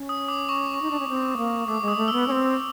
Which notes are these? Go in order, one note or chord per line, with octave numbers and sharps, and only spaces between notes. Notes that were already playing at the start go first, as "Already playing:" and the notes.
Already playing: C#4
D#6
D6
C#6
C#6
D#4
D4
C#4
C4
A#3
A3 D6
G#3
D#6
A3
B3 E6
C#4
C4